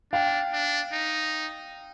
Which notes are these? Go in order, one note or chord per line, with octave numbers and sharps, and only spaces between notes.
D4 F5 G5
D4
D#4